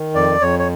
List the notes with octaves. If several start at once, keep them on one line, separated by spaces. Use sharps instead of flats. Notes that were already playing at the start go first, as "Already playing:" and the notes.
Already playing: D#3
F2 D5
F2 C#5
C#5